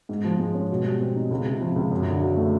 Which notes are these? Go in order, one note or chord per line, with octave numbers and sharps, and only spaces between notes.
G#2
F3
G#3
C#4
B2
G3
C4
D#4
C#2
C3
F3
C#2
F#2
D3
F#3
A3